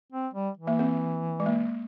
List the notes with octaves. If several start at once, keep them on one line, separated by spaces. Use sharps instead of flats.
C4
G3
E3
A#3
C4
G#3
A#3